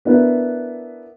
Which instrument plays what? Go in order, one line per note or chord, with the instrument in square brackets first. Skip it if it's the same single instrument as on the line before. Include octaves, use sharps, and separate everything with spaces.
[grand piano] B3 D4 E4 A#4 B4